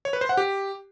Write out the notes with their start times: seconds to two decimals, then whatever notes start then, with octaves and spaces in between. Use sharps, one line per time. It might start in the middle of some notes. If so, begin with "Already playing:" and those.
0.05 C#5
0.13 B4
0.21 C5
0.29 F#5
0.37 G4